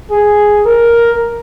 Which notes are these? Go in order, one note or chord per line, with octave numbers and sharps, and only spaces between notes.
G#4
A#4